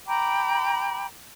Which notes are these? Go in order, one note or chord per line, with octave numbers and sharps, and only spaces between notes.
G5 A#5 B5 D6